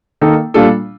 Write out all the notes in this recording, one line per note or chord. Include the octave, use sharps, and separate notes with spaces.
D#3 A#3 D#4 A4
A#2 G3 D4 F4 A4